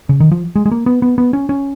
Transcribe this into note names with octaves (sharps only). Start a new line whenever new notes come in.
C#3
D#3
F3
G#3
G#3
A#3
B3
B3
B3
C#4
C#4